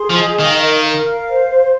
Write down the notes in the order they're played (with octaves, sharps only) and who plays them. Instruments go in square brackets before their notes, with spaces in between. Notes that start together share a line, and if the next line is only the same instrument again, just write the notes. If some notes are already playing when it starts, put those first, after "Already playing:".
Already playing: [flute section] G#4 C6
[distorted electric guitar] F3
[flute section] D#5
[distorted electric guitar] D#3 [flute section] F5
[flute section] A#4
A#4
F5
C5
C5